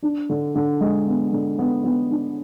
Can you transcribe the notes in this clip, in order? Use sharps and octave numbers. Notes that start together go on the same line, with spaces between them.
D4
D3
D3
G#3
B3
D3
B3
B3
D4